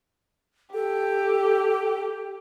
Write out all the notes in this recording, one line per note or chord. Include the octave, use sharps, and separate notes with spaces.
G4 A4